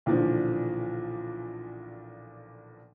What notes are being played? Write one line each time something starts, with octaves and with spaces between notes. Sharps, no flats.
B1 A#2 D3 E3 F3